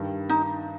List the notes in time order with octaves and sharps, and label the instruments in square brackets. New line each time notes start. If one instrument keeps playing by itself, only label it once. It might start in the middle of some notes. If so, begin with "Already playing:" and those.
Already playing: [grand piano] G2 D#3 G3
[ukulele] D#4